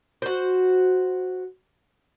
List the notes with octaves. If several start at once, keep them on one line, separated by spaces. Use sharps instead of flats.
F#4 C5